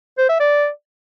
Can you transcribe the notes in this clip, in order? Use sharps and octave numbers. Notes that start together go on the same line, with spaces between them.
C5
E5
D5